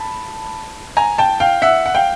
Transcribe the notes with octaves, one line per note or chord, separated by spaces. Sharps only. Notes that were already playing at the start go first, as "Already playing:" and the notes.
Already playing: A5 B5
G#5 A#5
G5 A5
F5 G5
E5 F#5
F#5
F5 G5